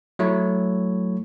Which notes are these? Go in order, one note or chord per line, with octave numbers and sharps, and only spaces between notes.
F#3 A3 E4 C#5